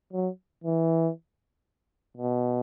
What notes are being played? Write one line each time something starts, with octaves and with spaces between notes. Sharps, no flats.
F#3
E3
B2